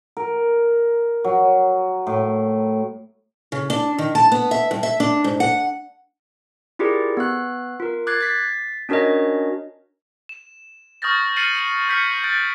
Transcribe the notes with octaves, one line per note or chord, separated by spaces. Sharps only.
A#4
F#3
A2
C#3
D4
D#3
A5
B3
E5
G2
E5
D4
G#2
F#5
E4 F4 G4 G#4 A#4 D5
B3 F5 F#6
F4 A#4
D6 F#6 G#6 A6 C7
A6 B6 C7
C#4 D4 F#4 A#4 C#5 D#5
E7
C#6 D#6 F6 G6 A6 A#6
F6 A6 C7 C#7 D#7 F#7
F6 G6 B6 C#7
F#6 A6 D7